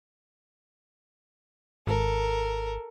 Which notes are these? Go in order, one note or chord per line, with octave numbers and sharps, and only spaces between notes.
G#1 A4 A#4